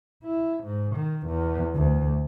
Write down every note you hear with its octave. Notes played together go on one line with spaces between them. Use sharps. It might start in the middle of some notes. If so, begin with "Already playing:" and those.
E4
G#2
D#3
E2
D2